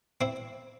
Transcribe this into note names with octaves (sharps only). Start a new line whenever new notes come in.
C4 E4